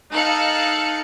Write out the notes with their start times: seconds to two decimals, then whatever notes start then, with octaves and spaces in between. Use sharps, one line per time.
0.11 D#4 A4 F5 F#6 C#7